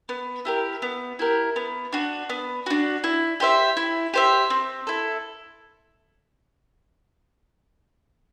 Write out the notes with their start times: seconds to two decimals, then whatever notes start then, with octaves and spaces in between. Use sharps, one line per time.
0.09 B3
0.45 E4 G4 A#4
0.82 B3
1.19 E4 G4 A#4
1.56 B3
1.93 D4 F#4
2.29 B3
2.66 D4 F#4
3.04 E4
3.40 G4 C5 E5
3.77 E4
4.14 G4 C5 E5
4.50 C4
4.87 E4 A4